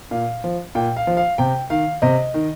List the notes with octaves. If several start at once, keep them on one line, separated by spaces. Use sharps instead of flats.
A#2 F5
F3
A#2 G5
F5
F3
F5
C3 G5
D#3 F5
C3 D#5
D#3